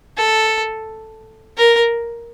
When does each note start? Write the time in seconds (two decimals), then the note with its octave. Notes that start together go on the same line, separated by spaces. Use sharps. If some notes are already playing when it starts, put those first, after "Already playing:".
0.17 A4
1.57 A#4